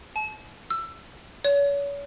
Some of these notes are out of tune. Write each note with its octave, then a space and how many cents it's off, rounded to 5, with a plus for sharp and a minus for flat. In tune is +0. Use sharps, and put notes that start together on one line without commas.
A5 -40
E6 +20
C#5 +35